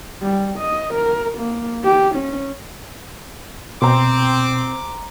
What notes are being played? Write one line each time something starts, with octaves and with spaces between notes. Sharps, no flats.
G3
D#5
A#4
A#3
G4
C#4
B2 C4 C5 A#5 D6